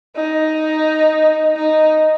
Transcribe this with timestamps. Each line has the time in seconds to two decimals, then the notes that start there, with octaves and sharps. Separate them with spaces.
0.16 D#4
1.56 D#4